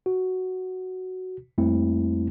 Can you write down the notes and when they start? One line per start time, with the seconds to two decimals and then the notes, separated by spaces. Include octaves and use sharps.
0.06 F#4
1.58 F2 G3 A3 A#3 C4 E4